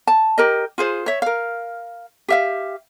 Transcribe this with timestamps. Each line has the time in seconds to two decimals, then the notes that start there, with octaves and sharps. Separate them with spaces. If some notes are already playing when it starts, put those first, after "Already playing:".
0.07 A5
0.38 G4 A#4 D#5
0.78 F4 G#4 C5
1.06 C#5 E5
1.22 A#4 F5
2.28 G4 E5 F5